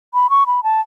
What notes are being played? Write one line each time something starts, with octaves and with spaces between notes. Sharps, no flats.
B5
C#6
B5
A5